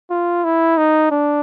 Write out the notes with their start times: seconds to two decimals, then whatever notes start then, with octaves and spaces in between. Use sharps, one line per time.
0.10 F4
0.44 E4
0.77 D#4
1.11 D4